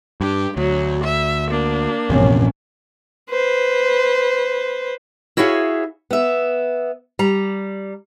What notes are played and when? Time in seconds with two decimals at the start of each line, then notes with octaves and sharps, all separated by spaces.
0.21 G2 G4
0.57 D2 F#3
1.03 E5
1.50 A#3 D4
2.10 A#1 E2 G2 C3 C#4
3.30 B4 C5
5.37 E4 F#4 G#4 C#5 E5 F5
6.10 B3 E5
7.19 G3 A#5